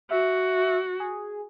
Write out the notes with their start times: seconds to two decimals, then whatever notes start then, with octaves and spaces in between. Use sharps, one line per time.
0.11 F#4 E5
1.00 G#4